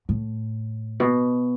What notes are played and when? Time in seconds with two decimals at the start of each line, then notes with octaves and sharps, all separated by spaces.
0.09 A2
1.00 B2